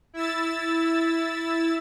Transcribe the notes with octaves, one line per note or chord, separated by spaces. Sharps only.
E4 E6 A6